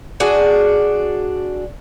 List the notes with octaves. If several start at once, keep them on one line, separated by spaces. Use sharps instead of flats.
D4 F#4 G#4